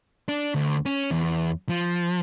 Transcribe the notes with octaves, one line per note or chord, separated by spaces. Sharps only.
D4
D2
C#4
E2
F3